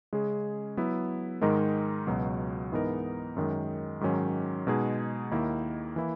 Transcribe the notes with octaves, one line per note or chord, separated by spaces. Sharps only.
C#3 G#3 C#4 G#4
F#3 B3 E4
G#2 D#3 G#3 D#4 A#4
C#2 B2 F#3
G#2 E3 B3 D#4 A#4
F#2 D#3 G#3
G#2 D#3 F#3 C#4
B2 G#3 D#4 G#4
D#2 D#3 A#3 E4
E3 A#3 E4